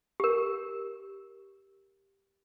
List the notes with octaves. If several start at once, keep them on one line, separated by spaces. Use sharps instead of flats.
G4 A#4